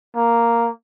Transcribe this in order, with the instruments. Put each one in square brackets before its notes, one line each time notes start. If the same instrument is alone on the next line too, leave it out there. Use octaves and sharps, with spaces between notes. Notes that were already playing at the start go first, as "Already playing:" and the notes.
[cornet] A#3